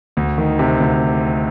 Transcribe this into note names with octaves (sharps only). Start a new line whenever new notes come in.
D2
D#3
C3
D2